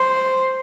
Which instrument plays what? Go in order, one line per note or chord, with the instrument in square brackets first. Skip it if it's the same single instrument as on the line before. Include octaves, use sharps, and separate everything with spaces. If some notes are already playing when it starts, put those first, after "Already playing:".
Already playing: [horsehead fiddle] C5